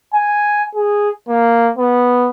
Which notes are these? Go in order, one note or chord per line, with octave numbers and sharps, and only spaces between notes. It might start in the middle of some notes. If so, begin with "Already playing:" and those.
G#5
G#4
A#3
B3